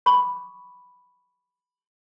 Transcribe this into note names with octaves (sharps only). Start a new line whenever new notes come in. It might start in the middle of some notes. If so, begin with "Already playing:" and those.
B5 C#6 D6